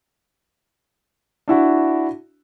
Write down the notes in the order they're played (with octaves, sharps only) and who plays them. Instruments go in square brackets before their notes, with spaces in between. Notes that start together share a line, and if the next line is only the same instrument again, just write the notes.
[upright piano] D4 E4 F#4